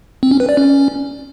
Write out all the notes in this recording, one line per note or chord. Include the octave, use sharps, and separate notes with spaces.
C4
C#4
B4
D5
C#4